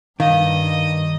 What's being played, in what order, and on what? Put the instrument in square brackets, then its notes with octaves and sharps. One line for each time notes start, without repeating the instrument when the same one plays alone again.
[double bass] G2 [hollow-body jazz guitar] D#3 [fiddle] D#5 [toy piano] F5